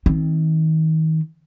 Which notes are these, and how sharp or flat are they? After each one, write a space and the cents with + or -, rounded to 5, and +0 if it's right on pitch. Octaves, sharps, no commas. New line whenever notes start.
D#3 +35 C4 +0